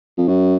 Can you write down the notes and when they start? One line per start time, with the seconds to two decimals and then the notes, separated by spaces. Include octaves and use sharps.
0.18 F2
0.29 F#2